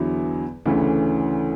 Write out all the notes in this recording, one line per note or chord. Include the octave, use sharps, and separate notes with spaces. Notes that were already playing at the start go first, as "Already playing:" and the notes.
Already playing: E2 D3 F#3 B3 E4
D2 C#3 E3 A3 C#4